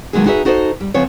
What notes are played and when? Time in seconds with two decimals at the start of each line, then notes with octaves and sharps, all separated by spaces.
0.13 B2 D#3 F#3 G#3 A#3 G#4
0.26 D#4 F#4 G#4 B4 C#5 E5
0.45 D#4 F#4 A4 C5 C#5 D#5
0.81 G3
0.94 C#3 F3 B3 C4 C#5